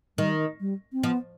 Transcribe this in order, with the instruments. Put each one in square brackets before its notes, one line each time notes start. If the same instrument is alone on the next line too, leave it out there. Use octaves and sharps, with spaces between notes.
[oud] D#3 [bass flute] G3
[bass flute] G3
C4
[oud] F3 [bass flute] B3